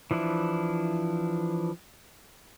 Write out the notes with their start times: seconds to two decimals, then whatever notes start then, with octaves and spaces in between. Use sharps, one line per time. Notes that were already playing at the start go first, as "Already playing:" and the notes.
0.11 E3 F3 D4 E4